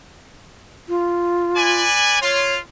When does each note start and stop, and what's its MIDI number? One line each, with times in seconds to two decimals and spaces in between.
0.88 1.82 65
1.56 2.21 71
1.56 2.21 74
1.56 2.21 80
2.21 2.59 65
2.21 2.53 73